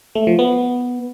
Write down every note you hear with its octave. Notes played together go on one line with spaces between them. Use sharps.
A3
F3
B3